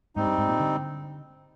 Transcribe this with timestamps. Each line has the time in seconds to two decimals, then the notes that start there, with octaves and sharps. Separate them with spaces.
0.16 G#2 G3 C4 D#4
0.27 G2
0.38 G#2
0.48 A#2
0.60 D3